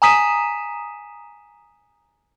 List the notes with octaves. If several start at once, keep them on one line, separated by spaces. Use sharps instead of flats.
G#5 A#5 D#6 B6 D#7 E7